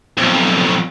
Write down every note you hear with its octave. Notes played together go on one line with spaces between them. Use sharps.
B1 F2